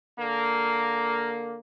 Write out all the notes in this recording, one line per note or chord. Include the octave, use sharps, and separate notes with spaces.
D3 A#3